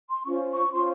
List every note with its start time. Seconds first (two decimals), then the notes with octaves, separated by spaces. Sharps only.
0.09 C6
0.25 C#4 F4 C5 C#6
0.52 C#6
0.72 C#4 F4 C5 C6